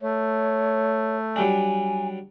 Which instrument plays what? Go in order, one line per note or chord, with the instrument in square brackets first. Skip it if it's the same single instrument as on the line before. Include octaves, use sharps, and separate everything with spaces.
[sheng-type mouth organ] A3 [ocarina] C#5
[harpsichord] F#3 G3 D4 [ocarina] G#5